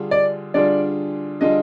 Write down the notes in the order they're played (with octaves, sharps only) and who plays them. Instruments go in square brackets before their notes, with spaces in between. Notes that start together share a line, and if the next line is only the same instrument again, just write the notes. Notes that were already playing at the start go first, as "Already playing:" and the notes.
Already playing: [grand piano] D3 G3 D4 F4 G#4
[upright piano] D5
[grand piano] D3 G3 D4 F4 G#4 [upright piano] D5
[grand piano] D3 G3 D4 F4 G#4 [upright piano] D#5